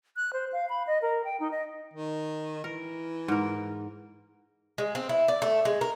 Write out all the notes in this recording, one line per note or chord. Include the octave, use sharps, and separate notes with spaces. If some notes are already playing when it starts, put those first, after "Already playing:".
F#6
C5
F5
B5
D#5
A#4
G5
D#4
D#5
D#3
E3 A#4
G#2 A#4
G#3
C4
E4
D5
A3
G#3
A#4